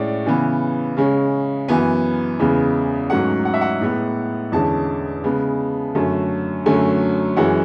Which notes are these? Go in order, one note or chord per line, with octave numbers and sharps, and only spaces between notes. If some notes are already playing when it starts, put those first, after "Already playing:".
Already playing: A2 G#3 C#4 C#5 D5
C#3 E3 B3
C#3 G#3 C#4
F#2 E3 B3 G#5
E2 C#3 G#3 B3
G#2 F#3 A3 C#4 F#5
F#5
E5
F#5
A2 G#3 B3
E2 D3 G#3 C#4 A5
C#3 G#3 B3
F#2 D3 A3 C#4
F#2 D3 F#3 A3 C#4 G#5
F#2 E3 G#3 C#4 F#5